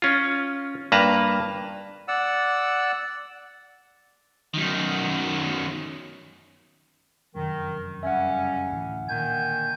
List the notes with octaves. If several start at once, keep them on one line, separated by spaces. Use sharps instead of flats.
C#4 F4
G2 A#3 B4 A5 A#5
D5 F#5 E6
F#2 D#3
F1 F#2 D#3
C#3 G3 C#4 E5 F#5
D2 A2 E3
A#2 D3 D#3 G#5 G6